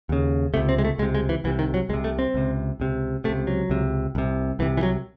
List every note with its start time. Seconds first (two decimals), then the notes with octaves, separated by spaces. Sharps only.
0.09 D#2 C#3
0.54 C3 A3
0.57 C#2
0.69 C4
0.78 G#3
0.84 A3
0.98 C#2 G#3
1.02 C3
1.15 G#3
1.29 E3
1.44 C2 C3 E3
1.59 D#3
1.74 F#3
1.89 C2 G#3
1.93 C3
2.04 A3
2.19 C4
2.34 C#2 C3
2.80 C#2 C3
3.24 C3 A3
3.29 C#2
3.47 F#3
3.70 C#2 C3
4.15 C2 C3
4.59 C2 C3 E3
4.77 E3
4.83 F#3